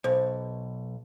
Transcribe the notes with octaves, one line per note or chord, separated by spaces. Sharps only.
B1 C5